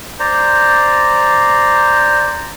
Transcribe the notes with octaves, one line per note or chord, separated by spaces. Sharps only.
C5 D5 A#5